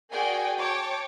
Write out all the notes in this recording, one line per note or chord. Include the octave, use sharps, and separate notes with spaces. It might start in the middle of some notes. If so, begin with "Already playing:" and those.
F#4 G#4 A#4 D5 G5 G#5
C#5 G5 A5 D6